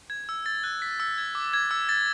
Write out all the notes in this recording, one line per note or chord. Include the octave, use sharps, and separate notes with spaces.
G#6
E6
A6
F#6
B6
E6
G#6
D6
G#6
E6
A6